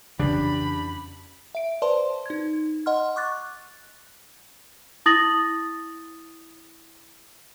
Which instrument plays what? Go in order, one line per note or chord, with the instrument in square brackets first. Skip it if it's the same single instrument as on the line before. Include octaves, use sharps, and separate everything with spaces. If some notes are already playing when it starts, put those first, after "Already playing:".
[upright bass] F2 C#4 [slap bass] C#3 E3 [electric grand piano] D4 G4 [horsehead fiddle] B5
[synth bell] E5 D7
B4 C5 D5 A5 C6
D#4 G#6
D#5 F#5 C6 F6
C#6 D6 F#6 A6
[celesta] E4 D#6 A6 A#6 F#7